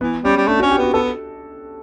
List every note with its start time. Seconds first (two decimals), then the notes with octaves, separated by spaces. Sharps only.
0.01 E3 B3
0.24 G3 C#4
0.37 G3
0.48 A3 D4
0.59 F#4
0.62 C#4
0.71 G4
0.78 B3 F#4
0.94 B3 A4